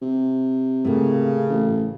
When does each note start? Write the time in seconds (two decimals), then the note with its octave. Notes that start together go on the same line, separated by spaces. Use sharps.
0.02 C3
0.85 A2 C#3 A#3
1.50 A1